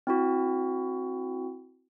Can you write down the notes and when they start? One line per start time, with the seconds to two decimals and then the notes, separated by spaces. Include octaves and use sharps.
0.07 C4 E4 F#4